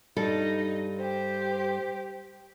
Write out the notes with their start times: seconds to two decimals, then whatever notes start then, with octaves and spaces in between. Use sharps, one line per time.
0.16 G2 G3 D#4 A4
0.97 G4 C5